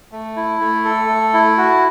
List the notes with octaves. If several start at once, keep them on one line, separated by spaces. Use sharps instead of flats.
A3
E4
A3
A4
A3
E4
F#4